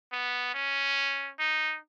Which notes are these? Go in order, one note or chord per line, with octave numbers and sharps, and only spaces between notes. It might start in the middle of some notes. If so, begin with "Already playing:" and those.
B3
C#4
D#4